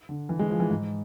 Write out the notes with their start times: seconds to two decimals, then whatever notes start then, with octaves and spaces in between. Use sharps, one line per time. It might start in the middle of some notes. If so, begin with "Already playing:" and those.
0.09 D3
0.29 E3
0.39 G#3
0.50 F3
0.60 E3
0.70 G#2